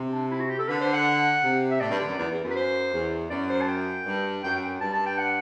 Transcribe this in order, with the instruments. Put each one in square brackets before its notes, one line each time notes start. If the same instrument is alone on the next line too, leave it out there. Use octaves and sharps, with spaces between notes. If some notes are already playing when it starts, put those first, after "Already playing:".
Already playing: [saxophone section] C3
[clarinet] D4
E4
F#4
G4
A4
[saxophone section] D3 [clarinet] B4
[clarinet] C5
F#5
[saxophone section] C3
[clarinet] E5
[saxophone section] A2 [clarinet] D5
[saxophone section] G2
D3
F#2
E2
E2
F#2
[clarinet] B4
C5
[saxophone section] E2
[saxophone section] F#2 [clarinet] D5
[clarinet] C5
A5
G5
[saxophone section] G2
[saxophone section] F#2 [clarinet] G5
[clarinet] G5
[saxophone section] G2 [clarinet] A5
[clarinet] A5
G5
F#5